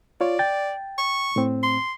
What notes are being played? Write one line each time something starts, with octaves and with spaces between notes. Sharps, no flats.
F4 C#5 D5
G5 A6
C#6
A2 C4
C6